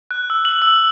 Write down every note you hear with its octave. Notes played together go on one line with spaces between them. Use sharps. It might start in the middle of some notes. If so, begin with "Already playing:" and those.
F#6
E6
F#7
E6